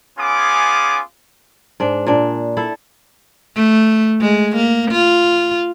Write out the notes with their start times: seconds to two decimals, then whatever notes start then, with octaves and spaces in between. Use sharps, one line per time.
0.18 B3 C#4 F4 G#4 G#5 D6
1.80 G#2 D4
2.07 A#2 D4
2.57 E4 A4
3.56 A3
4.21 G#3
4.56 A#3
4.91 F4